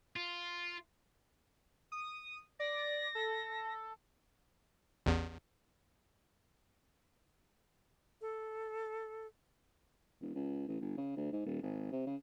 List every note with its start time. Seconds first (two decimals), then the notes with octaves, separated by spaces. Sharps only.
0.16 F4
1.92 D#6
2.60 D5 A#6
3.15 A4
5.06 A1 E2
8.21 A4
10.22 E1
10.34 C#2
10.68 A1
10.81 G1
10.97 C#3
11.17 D2
11.32 G#2
11.46 D#1
11.62 G#1
11.92 C3
12.06 C#3